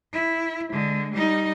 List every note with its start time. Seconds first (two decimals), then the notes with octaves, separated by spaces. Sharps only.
0.13 E4
0.72 D3 G#3
1.13 G3 D#4